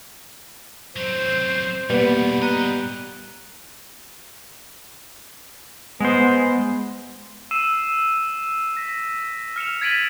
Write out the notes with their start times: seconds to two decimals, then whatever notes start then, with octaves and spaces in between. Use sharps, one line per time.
0.96 F#3 C4 C5
1.90 E2 B2 G3 A#3 B3 B4
2.42 A#2 D#5 F#5 A#5
6.00 G#3 B3 C5
7.51 E6 C7 D#7 E7
8.77 A#6 B6
9.56 F6 C#7 E7 F7
9.81 G#6 A6 B6 D7 D#7 F#7